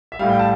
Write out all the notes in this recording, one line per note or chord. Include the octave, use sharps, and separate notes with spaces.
E5
A2 G3 F5
G5
A5